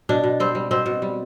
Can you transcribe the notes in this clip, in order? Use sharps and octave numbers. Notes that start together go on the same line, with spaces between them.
B2 D4
B2
G3 C4
G3
B2 C4
B2
G3